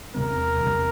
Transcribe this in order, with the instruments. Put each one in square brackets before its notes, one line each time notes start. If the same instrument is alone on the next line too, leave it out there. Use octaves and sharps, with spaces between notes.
[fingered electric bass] E2 C3 G3 C4 [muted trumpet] A#4
[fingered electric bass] E2 C3 G3 C4